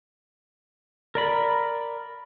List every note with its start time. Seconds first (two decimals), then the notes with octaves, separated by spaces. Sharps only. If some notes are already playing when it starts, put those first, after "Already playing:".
1.15 A#4 D5 B5